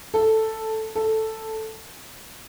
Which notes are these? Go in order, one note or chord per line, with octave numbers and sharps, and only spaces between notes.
A4
A4